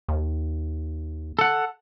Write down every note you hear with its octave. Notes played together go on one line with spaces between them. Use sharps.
D#2
A4 F#5